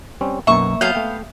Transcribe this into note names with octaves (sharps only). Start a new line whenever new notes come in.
G3 C4 C#4
B1 F#2 B2 A#3 E5 C#6
F#3 B3 F5 G#5 G6
A3 G5